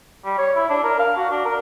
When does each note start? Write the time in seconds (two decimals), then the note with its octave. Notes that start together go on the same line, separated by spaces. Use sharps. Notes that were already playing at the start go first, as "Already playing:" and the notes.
0.24 G3
0.38 C#5
0.55 E4
0.70 D4
0.84 A#4
0.99 F5
1.17 F#4
1.30 D4
1.45 A#4